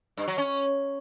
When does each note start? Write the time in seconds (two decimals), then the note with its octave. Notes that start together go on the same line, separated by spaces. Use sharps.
0.17 G2
0.28 F#3
0.38 C#4